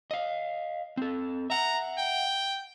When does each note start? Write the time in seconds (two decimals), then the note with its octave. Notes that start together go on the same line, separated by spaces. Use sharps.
0.11 D#5 F5
0.97 C4 A4
1.50 E5 F#5 A#5
1.98 G5